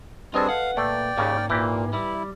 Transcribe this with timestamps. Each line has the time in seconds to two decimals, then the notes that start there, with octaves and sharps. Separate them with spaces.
0.34 G3 C4 D4 F4 G#4 A4 B4 D#5
0.49 F5 F#5
0.77 A#2 A3 D5 G5
1.18 D#2 G#2 C#3 A#3 C#4
1.50 A#2 E3 A#3 G4
1.93 G3 E4